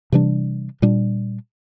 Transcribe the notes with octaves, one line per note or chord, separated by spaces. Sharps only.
C3 E3 G3 D4
A#2 G3 D4